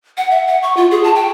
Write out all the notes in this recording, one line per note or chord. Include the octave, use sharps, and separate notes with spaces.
F#5
E5
F#5
C#6
F4
G#4
A5
G5